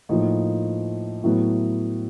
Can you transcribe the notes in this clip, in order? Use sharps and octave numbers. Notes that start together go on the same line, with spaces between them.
A2 F3 A#3 D#4
A2 F#3 B3 E4